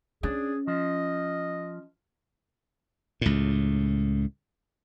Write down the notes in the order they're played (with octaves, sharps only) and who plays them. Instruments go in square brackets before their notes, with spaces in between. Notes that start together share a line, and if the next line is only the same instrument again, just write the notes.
[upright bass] C#4 [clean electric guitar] D4 [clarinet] G#4
[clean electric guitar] F3 [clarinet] D#5
[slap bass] C#2 A2